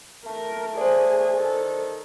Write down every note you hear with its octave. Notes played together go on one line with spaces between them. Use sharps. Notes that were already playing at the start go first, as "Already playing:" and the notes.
A3 A#4
G#4 C5 D5 G#5
D#3 A4